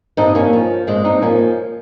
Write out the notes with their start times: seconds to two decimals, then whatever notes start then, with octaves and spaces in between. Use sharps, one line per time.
0.17 G2 C4 D#4
0.35 A#3 C#4
0.53 F3
0.87 G2 G#3 C4
1.04 C4 D#4
1.22 F3 A#3 C#4